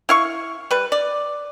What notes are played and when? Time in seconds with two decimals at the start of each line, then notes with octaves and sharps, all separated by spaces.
0.09 E4 F5 C#6
0.71 G3 B4
0.92 D5